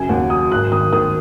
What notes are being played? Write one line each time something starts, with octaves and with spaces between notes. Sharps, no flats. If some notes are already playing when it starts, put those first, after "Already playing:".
Already playing: F#2 C#3 F#3 G#5
D#2 F#5
F#3 D#6
G#1 F#6
D#3 D#6
D#3 D#6